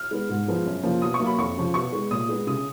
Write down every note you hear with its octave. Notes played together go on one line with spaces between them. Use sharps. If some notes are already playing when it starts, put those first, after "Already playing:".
Already playing: F6
G#3 B3
G#2
F3 G#3 B3
F#2
C#3 F3 A#3
B2 D#6
C#6
F#3 A#3
B5
F2 C#6
C#3 F3
B2 C#6
G#3 B3
A#2 D#6
G#3 B3
C#3 D#6